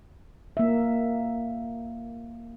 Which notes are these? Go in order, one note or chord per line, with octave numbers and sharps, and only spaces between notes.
A#3 E5